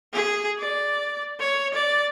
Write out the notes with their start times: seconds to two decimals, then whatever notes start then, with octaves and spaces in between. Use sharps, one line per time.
0.13 G#4
0.59 D5
1.40 C#5
1.74 D5